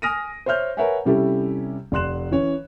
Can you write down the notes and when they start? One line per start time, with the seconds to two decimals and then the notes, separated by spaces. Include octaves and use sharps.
0.02 G#5 D#6 F6 A#6 D7 D#7
0.46 C5 C#5 E5 F6 G6
0.77 A#4 B4 C#5 E5 F#5 G#5
1.05 C3 G3 C#4 E4 G4 A4
1.92 F1 D5 C6 F#6 E7
2.31 E3 C#4 C#5